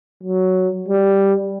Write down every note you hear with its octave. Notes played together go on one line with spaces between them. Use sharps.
F#3
G3